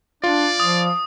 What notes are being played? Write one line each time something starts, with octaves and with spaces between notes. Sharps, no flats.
D4 F4 D5
F3 D#6